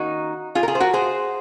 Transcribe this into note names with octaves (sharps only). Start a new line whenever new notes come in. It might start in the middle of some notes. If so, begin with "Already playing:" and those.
Already playing: D#3 A#3 C#4 D#4 F#4
F4 G#4
A#4
F4 G#4
C5
F#4 A#4
G#4 C5